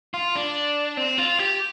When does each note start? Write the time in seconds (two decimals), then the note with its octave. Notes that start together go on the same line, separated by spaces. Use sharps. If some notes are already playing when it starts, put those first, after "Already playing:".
0.14 F4
0.35 D4
0.97 C4
1.18 F4
1.39 G4